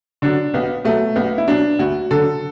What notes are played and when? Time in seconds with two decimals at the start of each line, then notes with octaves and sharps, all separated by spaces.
0.22 D3 F#3 D4
0.54 B1 B3
0.85 B2 F#3 A3
1.16 B1 B3
1.38 E4
1.47 B2 F#3 D4
1.79 D2 F#4
2.11 D3 F#3 A4